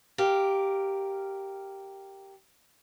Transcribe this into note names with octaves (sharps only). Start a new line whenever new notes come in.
G4 A#4 F5